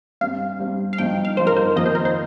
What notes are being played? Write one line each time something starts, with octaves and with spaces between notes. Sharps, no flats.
G2 G3 C4 F5
G2 G3 C4
F5
G2 F3 D#4 G5
F5
G2 F3 D#4 C5
A#4
C5
F2 D#3 A#3 D#4 D#5
C5
A#4
C5